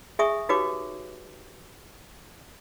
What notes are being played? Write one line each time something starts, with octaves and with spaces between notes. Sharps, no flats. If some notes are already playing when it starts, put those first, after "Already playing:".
G#4 E5 G#5 C#6 D#6
D#4 F#4 G4 B4 C#5 D6